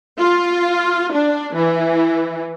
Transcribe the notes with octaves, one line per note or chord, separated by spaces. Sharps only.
F4
D4
E3